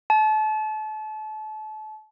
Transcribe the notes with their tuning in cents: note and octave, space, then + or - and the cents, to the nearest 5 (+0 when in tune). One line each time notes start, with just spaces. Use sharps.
A5 -30